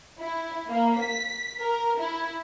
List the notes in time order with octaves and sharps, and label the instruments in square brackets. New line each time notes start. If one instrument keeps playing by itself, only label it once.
[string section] E4
A#3
B6
A#4
E4